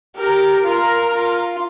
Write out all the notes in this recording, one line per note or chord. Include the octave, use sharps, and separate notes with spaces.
G4 A#4
F4 A#4
F4